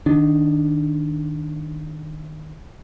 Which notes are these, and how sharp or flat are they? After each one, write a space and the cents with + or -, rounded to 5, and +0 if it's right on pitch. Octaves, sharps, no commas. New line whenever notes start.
D#3 -5 D4 +0